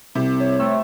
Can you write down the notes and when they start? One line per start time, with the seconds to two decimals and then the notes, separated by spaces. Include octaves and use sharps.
0.15 C2 C3
0.40 C#5
0.60 C3 A3 E6